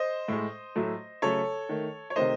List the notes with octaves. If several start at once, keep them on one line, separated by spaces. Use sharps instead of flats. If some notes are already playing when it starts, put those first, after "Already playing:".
Already playing: C5 D#5
A2 G#3
A2 F#3 A3
C#3 F#3 A3 A4 C#5
D#3 A3
C#5
C3 D#3 A3 C5 D#5